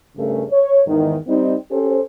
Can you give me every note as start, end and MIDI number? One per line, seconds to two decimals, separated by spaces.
0.17 0.44 43
0.17 0.44 49
0.17 0.44 57
0.17 0.44 68
0.17 0.44 70
0.50 0.81 73
0.87 1.16 40
0.87 1.16 44
0.87 1.16 51
1.27 1.54 55
1.27 1.54 60
1.27 1.54 63
1.71 1.99 61
1.71 1.99 67
1.71 1.99 69
1.71 1.99 72